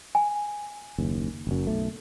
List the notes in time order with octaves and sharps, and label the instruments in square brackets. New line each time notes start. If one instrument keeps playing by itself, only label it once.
[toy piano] G#5
[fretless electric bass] F#1 D#2
F#1 F#2
B1 A3